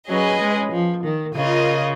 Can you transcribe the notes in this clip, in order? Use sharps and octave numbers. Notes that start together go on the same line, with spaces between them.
F#3 C#4 G#4 B4 D#5
G#3
F3
D#3
C#3 F4 A#4 D#5